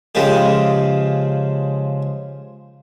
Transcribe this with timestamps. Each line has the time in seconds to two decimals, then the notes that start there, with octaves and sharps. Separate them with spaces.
0.15 C#3 F3 G#3 G4